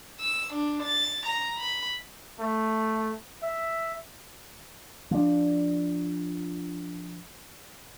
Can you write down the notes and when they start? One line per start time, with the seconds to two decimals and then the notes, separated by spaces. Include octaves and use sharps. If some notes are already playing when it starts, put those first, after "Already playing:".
0.20 E6
0.53 D4
0.83 A6
1.26 A#5
1.58 B5
2.40 A3
3.43 E5
5.11 F3 D4